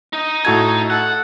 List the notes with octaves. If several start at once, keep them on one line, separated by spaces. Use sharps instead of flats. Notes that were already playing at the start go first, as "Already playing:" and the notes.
D#4 D#5
A2 F#4 A4 G#6
A4 F#5